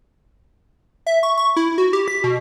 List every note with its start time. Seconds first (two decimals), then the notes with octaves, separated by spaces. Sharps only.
1.07 E5
1.23 C#6
1.37 C#6
1.56 E4
1.78 F#4
1.93 G4
2.08 B6
2.24 B2